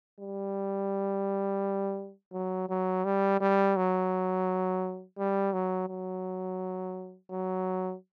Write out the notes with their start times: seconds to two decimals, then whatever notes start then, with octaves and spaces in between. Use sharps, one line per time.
0.21 G3
2.33 F#3
2.69 F#3
3.05 G3
3.41 G3
3.76 F#3
5.18 G3
5.53 F#3
5.89 F#3
7.31 F#3